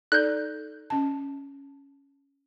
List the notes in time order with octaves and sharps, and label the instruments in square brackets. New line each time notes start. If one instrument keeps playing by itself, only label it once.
[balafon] D#4 A4 D5 [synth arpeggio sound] F#6 G6
[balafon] C#4 A5